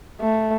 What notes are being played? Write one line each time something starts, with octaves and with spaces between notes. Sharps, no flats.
A3